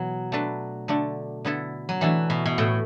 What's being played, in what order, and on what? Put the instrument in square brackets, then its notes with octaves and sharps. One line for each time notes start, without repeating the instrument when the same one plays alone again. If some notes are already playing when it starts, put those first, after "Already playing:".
Already playing: [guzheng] B2 F#3 [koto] E3 B3
[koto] A3 D4 B4
D3 A3 D4
D3 B3 E4 A4
[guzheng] F#3
[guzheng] E3 [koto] A3 D4 B4
[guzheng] B2
B2
[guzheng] A2 [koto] A3 F#4 A4